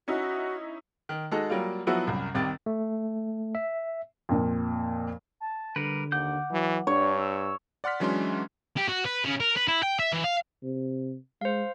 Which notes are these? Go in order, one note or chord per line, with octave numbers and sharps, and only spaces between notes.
C#4 D#4 E4 F#4
D#3
G#3 D#4 F#4 A4
F#3 G3 A#3 F4
F3 F#3 B3 E4 F#4
C2 F#2
C2 C3 D#3 A6
A3
E5
F2 A#2
A5
D3 G3 A#4 B4
D#2 F#5 D6 G6
E3 F#3
G2 D4 C#5
E6
D5 F#5 C6 F6 B6
E3 F#3 G#3 C#4 D4 C6
G4
F#4
B4
C#3
A#4
B4
E4
G5
E5
E3
F5
C3
G#3 C5 F5